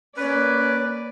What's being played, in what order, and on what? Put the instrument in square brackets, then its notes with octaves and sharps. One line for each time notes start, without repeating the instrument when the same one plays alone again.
[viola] A#3 D5 [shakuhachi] C#4 [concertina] B4